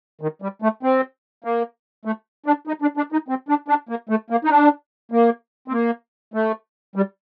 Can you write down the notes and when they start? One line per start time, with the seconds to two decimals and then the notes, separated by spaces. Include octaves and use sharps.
0.21 D#3
0.42 G3
0.62 A3
0.83 C4
1.44 A#3
2.05 A3
2.46 D4
2.67 D#4
2.82 D4
2.97 D4
3.12 D#4
3.28 C4
3.49 D4
3.68 D4
3.89 A#3
4.09 A3
4.30 A#3
4.45 D#4
4.50 D4
5.12 A#3
5.68 C4
5.72 A#3
6.34 A3
6.96 G3